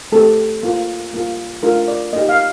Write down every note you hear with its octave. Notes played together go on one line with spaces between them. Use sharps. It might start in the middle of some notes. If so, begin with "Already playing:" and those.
A3 C4 G4 A4
A#3 F4
G3 A#3 F4
A3 D4 F4 A#4
D5
A#3 D#4 G4 D#5
F5